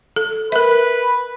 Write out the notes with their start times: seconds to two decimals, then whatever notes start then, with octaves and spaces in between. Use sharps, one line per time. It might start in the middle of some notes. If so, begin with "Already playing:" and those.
0.16 A4
0.52 A#4 B4 E5